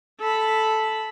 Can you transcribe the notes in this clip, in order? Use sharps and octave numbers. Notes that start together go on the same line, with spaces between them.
A4 B5